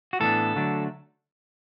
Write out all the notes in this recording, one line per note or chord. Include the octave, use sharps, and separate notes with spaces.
F#4
A2 E3 B3 D4 A4
D3 F#3 A3 D4